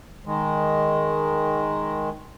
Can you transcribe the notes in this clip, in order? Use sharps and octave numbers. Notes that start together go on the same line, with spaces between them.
D#3 G#3